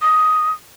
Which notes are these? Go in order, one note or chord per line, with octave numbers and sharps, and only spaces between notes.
D#6